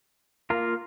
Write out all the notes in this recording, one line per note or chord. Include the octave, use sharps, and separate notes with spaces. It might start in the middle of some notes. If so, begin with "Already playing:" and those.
A#3 F4 A#4